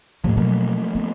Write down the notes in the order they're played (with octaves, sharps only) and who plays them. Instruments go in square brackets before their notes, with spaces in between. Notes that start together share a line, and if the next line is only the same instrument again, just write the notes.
[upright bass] D#2 A2 [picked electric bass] F3 G3 A3
[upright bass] B2 F#3 [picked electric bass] F3 A3 A#3
[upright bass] B3